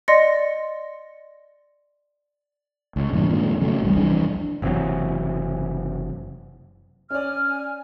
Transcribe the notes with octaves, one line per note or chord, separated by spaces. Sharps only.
D5 D#5 C6 A#6 C#7
C#2
G2 A#2 E3 D4
F2 A#2 D#3 G#3
C#3 F#3 A3 A#3
D#1 A1 G3 G#3
C2 F2 E3 D4
F#1 C3 E3 F#3
C#4 D5 G#5 F6